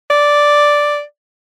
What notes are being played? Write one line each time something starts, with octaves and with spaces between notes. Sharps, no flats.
D5